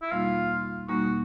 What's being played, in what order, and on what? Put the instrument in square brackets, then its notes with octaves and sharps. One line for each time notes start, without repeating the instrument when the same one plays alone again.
[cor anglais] E4
[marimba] E2 B2 G3 A#3 D#4 [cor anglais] F4
[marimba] E2 B2 G3 A#3 D#4 [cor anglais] F#4